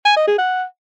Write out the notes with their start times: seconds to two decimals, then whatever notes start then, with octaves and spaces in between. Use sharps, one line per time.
0.05 G#5
0.16 D#5
0.28 G#4
0.39 F#5